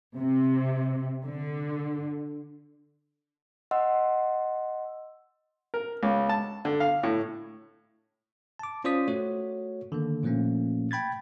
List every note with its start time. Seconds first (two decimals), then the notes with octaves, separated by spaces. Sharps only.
0.16 C3
1.24 D3
3.71 D#5 F#5 C6 E6
5.74 A#4
6.03 C#2
6.29 A5
6.65 D3
6.80 F5
7.03 A2
8.59 A5 D6
8.84 C#4 F4 C5 D5 D#6 B6
9.08 A3 F#4 C#5 F#5
9.92 D3 D#3 A#3
10.23 A#2 F3 A3 A#3 C#4
10.91 G5 B5 G#6 A6